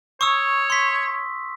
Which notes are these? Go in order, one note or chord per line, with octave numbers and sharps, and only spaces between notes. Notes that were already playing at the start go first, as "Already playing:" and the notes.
C#5 C#6 D#6 E6
C6 B6